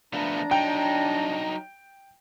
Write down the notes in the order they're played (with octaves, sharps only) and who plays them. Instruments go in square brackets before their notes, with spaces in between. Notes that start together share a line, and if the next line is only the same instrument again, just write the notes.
[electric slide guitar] F3 A3 B3 [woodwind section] D4 A#5
[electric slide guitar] F#3 D#4 [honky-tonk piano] G5